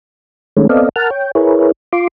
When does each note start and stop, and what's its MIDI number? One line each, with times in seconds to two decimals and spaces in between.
0.57 0.67 51
0.57 0.67 56
0.57 0.67 57
0.57 0.67 61
0.69 0.89 59
0.69 0.89 60
0.69 0.89 69
0.69 0.89 74
0.69 0.89 75
0.69 0.89 77
0.96 1.10 70
0.96 1.10 78
0.96 1.10 81
0.96 1.10 89
1.11 1.31 73
1.11 1.31 79
1.35 1.72 64
1.35 1.72 68
1.35 1.72 70
1.35 1.72 71
1.35 1.72 73
1.93 2.07 65
1.93 2.07 84
1.93 2.07 86